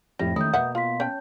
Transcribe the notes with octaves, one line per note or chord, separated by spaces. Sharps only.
F2 A2 G3 E4 A#6
D#3 A3 C#4 E4 D#6 G6
B2 A#3 B4 E5 F#5
F4 F5 C6 B6
C#4 C#5 G5 A5 G6